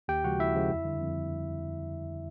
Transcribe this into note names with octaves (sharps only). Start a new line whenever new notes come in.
D#2 G4 G5
C#3 F3 G#3 F#4 F#5
D#2 E4 E5
C#3 F3 G#3
F2
D3 G3
F2